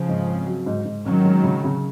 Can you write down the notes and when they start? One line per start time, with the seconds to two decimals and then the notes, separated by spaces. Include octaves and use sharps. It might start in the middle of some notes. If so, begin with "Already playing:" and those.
Already playing: C#3 F3
0.08 G#2
0.28 C4
0.47 F#3
0.66 G#2
0.85 G#2
1.05 D#3 F#3 C#4
1.25 G#3
1.44 C#3
1.64 C#3